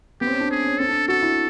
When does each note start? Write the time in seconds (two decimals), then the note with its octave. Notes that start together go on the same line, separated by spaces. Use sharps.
0.21 B3 G4
0.26 C4
0.31 C#4
0.40 D4
0.51 G#4
0.64 C#4
0.78 C4 A4
0.88 D4
1.08 F#4 A4
1.22 E4